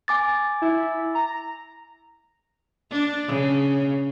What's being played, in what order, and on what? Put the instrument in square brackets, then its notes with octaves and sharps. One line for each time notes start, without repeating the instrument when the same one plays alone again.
[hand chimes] G#5 D6 A6
[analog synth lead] E4
A#5
[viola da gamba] D4
C#3